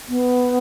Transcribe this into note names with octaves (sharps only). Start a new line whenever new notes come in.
B3